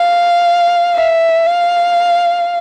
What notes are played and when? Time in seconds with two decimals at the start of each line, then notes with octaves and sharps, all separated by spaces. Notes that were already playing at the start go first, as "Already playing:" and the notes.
Already playing: F5
0.95 E5
1.47 F5